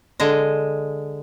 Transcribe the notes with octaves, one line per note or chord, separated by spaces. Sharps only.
D3 G#3 D#5